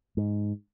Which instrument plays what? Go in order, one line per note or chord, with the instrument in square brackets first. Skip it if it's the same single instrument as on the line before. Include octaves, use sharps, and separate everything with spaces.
[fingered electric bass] G#2